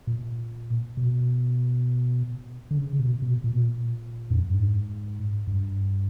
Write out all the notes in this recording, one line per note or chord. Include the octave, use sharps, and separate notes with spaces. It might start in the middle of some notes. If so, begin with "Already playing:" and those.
A#2
B2
D3
C#3
B2
B2
A#2
B2
A#2
F2
F#2
G2
G#2
G2